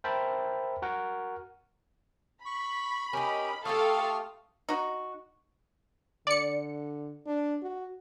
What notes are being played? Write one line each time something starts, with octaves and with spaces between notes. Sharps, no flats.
A#4 C5 E5 G5 A5 B5
F#4 A#4 F#5
B5 C#6
C#4 D#4 G4 A#4
A3 F4 G4 A4 F5 C#6 D#6 F6
D#4 F#4
D3 D5 C#7
D4
F#4